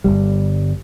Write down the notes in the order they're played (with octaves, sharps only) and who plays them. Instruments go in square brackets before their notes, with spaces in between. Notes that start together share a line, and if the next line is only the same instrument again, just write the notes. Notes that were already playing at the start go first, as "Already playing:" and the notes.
[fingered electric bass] G1 D#2 G3